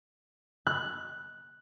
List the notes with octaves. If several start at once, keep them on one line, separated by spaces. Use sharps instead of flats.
F#6